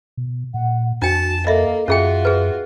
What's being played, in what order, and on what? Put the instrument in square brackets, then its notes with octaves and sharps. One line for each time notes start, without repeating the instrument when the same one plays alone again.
[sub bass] B2
[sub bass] A#2 [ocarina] F#5
[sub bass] F2 [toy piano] D4 G5 [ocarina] F#4 [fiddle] A5
[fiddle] A#3 [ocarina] A4 [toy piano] D#5 E5
[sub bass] F#2 [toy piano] C#4 G#4 G5 [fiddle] F4 F#4 [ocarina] E5
[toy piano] G#4 B4